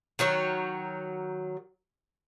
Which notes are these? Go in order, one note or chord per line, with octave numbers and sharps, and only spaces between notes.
D#3 F#3 C#5